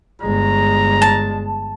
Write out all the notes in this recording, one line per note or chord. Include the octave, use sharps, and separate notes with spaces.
G1 G#3 A#5
A5